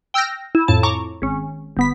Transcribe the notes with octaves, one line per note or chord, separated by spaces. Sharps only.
G5 E6 F6 G6 A#6
E4
F2 A2 A5
A#5 C#6 D6
G#1 C#4
G1 B3 B6